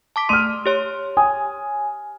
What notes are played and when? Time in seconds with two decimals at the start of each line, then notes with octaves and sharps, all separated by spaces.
0.16 A5 D6 B6
0.29 A3 C6 F6 D#7
0.66 G4 C#5 C6
1.17 G#5 D#6